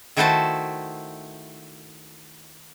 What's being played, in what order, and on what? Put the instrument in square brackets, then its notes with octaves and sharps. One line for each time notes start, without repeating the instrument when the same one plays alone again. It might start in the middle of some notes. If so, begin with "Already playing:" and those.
[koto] D#3 A3 E4 F#4 C5 A5